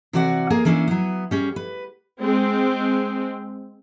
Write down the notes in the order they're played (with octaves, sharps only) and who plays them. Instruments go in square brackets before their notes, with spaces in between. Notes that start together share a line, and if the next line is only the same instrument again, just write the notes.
[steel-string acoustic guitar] C3 E3 F#4 D5 F5 F#5
A#3 G#4 A#4
E3 A#3 C#4 D4 E4
F#3 B3
G3 C#4 G#4
B4
[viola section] G#3 C4